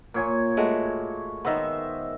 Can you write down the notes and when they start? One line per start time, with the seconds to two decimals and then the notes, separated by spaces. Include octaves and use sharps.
0.14 A#2 C#5 G#5
0.57 G#3 A3 F#4
1.45 D#3 B3 C5 D#5 E5